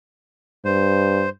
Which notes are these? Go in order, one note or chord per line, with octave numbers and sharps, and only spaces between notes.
G2 C5